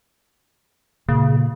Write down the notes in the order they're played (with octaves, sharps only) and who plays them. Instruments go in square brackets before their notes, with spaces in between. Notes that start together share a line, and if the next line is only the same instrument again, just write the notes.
[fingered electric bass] A#2 [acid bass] C#3